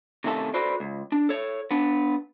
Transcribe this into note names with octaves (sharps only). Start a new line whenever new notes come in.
C3 D#3 A3 C#4 F#4 A4
F#4 A4 B4 C5 D5
C#2
D4
A4 C#5
B3 D4